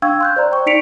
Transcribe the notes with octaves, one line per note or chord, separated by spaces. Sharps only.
D4 F5 G5 C#6 E6 G#6
C6 F#6 G6
C5 D5 A#5
G5 C#6
D#4 D5 B6 C#7 D7 F7